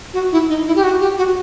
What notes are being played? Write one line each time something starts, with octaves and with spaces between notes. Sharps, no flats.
F#4
E4
D#4
E4
G4
F#4
G4
F#4